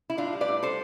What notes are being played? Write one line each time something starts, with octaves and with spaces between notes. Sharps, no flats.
E4
A2 D4 F4
G3
B4 D5
A2
G3 A4 C5